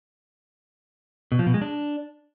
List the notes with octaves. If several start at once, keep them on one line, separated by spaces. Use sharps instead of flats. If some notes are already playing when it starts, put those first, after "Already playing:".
B2
F3
B2
G#3
D4